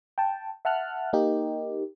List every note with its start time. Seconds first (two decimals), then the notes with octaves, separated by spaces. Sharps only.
0.18 G5 A5
0.65 E5 F#5 A5 F6 F#6
1.13 A#3 D#4 G4